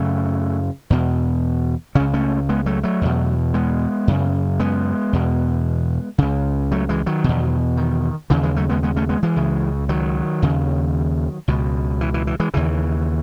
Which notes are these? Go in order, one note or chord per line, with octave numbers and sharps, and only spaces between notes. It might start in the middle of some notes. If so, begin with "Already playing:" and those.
Already playing: F#2 C#3 F#3 A3
E2 B2
C#2 C#3 C#4
A3 C#4
G#3 B3
F#3 A3
F#3 A3
E2 B2
G#3 B3
F#2 C#3
G#3 B3
E2 B2
C#2 C#3
F#3 A3
E3 G#3
D#3 F#3
E2 B2
D#3
D#2 C#3 E3
E3 G#3
F#3 A3
G#3 B3
G#3 B3
A3 C#4
G#3 B3
E3 G#3
C#2 C#3
D#3 F#3
D#2 C#3
C#2 B2
E3
E3
E3
E3 G#3
D#2 C#3 E3